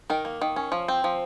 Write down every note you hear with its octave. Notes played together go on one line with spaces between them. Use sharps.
D#3 A#4
A#3
D#3
C#4
F3
C4
F3